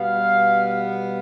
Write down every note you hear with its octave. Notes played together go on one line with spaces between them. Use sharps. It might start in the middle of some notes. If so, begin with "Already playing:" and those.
Already playing: B2 G3 B3 F5